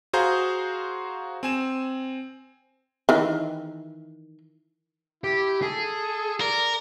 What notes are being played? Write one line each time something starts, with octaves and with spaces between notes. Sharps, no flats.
F#4 G#4 C5 F5 A#5 G6
C4 G#5 E7
D#3 E3
E4 G4
G#4 A4
A#4 D5